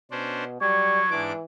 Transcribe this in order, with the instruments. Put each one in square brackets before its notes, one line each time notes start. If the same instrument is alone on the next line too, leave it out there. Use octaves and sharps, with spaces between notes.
[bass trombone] B2 [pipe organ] C#4 D4 C5
[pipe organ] F#3 [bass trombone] G3 [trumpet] C#6 [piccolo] G#6
[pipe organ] G#2 D4 D6 [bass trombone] E3